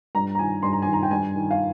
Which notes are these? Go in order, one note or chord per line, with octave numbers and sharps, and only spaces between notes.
G2 A#5
A#5
D#3 G#5
G2 C6
A#5
D#3 G#5
A#5
G5
G2 G#5
D#3
F5